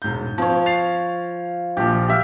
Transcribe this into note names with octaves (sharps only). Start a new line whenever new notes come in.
E1 G#2 G6
F3 C4 C#5
A6 C7 F7
A#1 A#2 F3 G4
G4 E5 F5